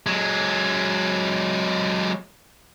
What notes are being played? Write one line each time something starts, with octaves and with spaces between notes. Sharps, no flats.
F#3 G#3